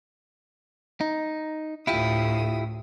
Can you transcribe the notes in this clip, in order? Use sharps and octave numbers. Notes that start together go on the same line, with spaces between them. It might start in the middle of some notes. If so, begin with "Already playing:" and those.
D#4
D2 A2 E4 F4 G4 D#6